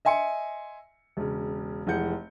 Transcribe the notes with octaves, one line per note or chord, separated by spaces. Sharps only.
D#5 E5 G#5 C6 C#7
E1 C#3
F1 E3 G#3 F#5 G6 C#7